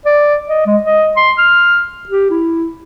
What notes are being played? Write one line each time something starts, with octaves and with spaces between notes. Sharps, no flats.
D5
D#5
G#3
D#5
C6
F6
G4
E4